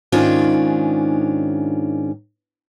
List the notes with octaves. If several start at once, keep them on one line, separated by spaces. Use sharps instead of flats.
G#2 D#3 C#4 D4 F4